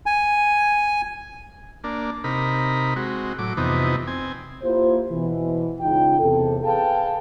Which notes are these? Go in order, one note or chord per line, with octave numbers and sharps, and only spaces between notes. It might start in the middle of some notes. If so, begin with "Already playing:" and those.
G#5
A#3 D4
C3 D#4 A#4 B5
G#3 C4 F#4
A2 F#3 D6
F2 C3 E3 B3 D#4
C4 G#5
A#3 E4 F4 G4 C5
B2 E3
C#2 C#3 D#4 F4 G5
E2 C3 A4
G#4 B4 F5 G5 A5